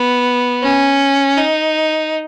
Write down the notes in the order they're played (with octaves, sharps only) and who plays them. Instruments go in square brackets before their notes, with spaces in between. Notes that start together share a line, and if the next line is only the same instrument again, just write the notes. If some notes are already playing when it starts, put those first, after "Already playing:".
Already playing: [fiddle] B3
C#4
D#4